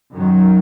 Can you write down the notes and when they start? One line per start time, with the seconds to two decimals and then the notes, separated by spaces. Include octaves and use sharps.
0.13 F#2 D#3 F#3